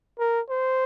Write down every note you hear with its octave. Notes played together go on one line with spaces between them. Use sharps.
A#4
C5